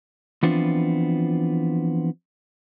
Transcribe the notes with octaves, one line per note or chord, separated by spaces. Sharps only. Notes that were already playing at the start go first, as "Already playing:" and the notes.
E3 F3 B3 C4 D4 F4